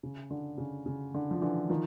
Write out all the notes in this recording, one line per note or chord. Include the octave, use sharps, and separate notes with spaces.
C#3
D3
C#3
C#3
D3
F3
D3 E3
D#3 F3